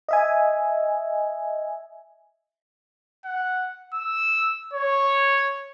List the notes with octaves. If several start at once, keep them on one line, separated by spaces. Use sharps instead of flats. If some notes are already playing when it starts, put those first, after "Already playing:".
D#5 E5 G#5
F#5
E6
C#5